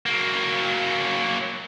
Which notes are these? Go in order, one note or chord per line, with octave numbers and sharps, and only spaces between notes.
F#3 A#3